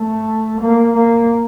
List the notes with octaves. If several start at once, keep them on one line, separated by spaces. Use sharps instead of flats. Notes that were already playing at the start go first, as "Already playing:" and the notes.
Already playing: A3
A#3
A#3